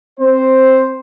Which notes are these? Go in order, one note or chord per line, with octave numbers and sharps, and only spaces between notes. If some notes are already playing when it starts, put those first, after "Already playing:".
C4 C5